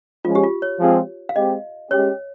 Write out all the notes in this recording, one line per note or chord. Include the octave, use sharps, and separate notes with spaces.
F3 G#3 C#4 F4
G4
F4
C#5
F3 G#3 C4 F4 G#4
F5
G#3 C4 G4 D#5
G#3 C#4 G4 C#5